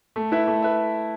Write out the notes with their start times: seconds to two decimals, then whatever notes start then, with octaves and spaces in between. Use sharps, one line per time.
0.16 A3
0.32 E4 B4 E5
0.48 A3
0.62 B4 E5